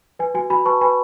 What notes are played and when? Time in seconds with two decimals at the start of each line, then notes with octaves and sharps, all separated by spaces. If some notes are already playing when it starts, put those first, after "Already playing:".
0.19 B4 G#5
0.34 F#4 G#5
0.50 F#4 G#5 B5
0.65 B4 A5 C#6
0.81 B4 G#5 B5